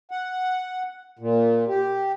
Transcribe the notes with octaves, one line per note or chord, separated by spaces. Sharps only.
F#5
A#2
G4